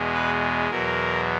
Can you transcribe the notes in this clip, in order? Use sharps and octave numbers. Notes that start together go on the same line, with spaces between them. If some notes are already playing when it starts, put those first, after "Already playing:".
Already playing: E2 B2 G#3
B4
E2 B2 F#3 A#4